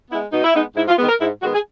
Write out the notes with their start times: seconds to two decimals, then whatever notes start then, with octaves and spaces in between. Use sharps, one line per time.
0.10 B3 E4
0.13 G#3
0.32 B2 D#4
0.44 E4
0.54 G#3 B3 D#4
0.76 G#2 E4
0.87 F4
0.98 D#3 G#3 B3
1.08 A#4
1.20 G#2 E4
1.41 D#3 G#3 B3 F#4
1.53 G#4